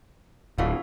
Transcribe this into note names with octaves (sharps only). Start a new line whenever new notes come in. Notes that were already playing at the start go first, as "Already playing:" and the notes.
D1 B2 E4 F4